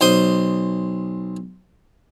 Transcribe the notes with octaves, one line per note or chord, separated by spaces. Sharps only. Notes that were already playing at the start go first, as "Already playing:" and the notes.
B1 C5 C6 D#6